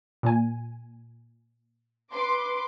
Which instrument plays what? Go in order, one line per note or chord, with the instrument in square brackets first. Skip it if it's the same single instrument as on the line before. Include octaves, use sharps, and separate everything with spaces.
[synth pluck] A#2 G#5
[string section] B4 C6 D6